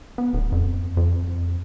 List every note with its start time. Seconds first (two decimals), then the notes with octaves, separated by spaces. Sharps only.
0.18 B3
0.33 D1
0.52 F2
0.97 F2